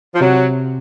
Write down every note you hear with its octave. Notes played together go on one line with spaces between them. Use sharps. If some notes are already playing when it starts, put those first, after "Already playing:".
F3
C3 F#3